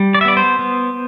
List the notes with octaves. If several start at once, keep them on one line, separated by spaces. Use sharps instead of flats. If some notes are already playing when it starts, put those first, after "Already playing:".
Already playing: G3
D5
E5
B3 D5
C5
B3